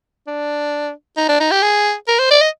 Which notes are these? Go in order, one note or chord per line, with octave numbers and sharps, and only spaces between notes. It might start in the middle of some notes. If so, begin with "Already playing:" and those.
D4
D#4
D4
D#4
G4
G#4
A#4
C5
D5
D#5